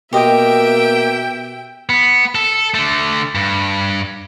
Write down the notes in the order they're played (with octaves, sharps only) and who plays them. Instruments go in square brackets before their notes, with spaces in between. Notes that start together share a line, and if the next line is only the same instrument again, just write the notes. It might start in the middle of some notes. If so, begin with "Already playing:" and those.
[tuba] B2 [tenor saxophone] A#3 [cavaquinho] G4 C5 D#5 [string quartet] E5 G5
[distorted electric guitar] B3
A4
D3 A3
G2